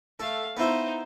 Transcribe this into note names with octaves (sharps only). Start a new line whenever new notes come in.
A3 A4 F5
B3 D#4 E4 C5